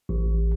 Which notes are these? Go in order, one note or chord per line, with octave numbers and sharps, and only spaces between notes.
A1